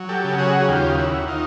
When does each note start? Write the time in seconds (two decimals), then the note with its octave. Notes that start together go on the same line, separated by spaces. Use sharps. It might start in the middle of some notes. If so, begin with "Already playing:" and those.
Already playing: F#3
0.09 G4 A4
0.24 C#3
0.38 F#4 G#4
0.60 F#4
0.68 D#2 F4 G4
0.98 E4 F#4
1.13 D#2
1.28 D#4 F4